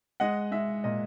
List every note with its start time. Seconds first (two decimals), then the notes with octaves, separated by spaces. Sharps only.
0.20 G#3 D#5 F#5
0.52 G#3 E5
0.84 A#2 D#5